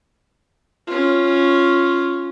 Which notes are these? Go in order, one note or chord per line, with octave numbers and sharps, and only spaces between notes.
C#4 F4